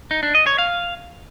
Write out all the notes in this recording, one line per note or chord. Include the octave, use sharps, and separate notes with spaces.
D#4
D4
D#5
C#5
F5